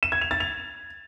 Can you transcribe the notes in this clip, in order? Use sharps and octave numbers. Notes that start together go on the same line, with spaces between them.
E7
G#6
F7
A6
F7